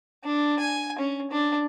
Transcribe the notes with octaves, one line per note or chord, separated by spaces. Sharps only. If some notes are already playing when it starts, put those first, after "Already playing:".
D4
G#5
C#4
D4